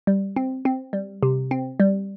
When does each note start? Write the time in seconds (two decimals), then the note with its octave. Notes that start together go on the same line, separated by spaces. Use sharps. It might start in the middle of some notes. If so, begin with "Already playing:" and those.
0.07 G3
0.36 C4
0.65 C4
0.93 G3
1.23 C3
1.51 C4
1.80 G3